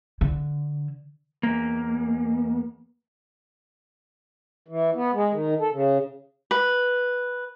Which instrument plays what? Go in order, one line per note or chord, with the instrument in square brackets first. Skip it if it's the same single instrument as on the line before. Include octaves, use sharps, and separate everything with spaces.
[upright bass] D3
[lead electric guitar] E2 A#3
[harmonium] E3
B3
G#3
D#3
A4
C#3
[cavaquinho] B4